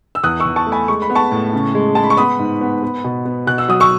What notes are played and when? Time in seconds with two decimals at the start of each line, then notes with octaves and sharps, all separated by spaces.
0.15 E6
0.23 E2 D#6 F#6
0.40 C#6 E6
0.46 E2
0.56 A5 C#6
0.67 A3
0.72 G#5 B5
0.88 G#3 C#6
1.02 B5
1.10 B3
1.15 A5 C#6
1.31 A2
1.53 C#3
1.75 G#3
1.95 G#3 A5
2.03 B5
2.10 C#6
2.17 B3 B5 D#6
2.39 G#2
2.61 B3
2.83 B3
3.04 B2
3.25 B3
3.47 B2 F#6
3.58 E6
3.68 F#3 D#6
3.80 C#6 E6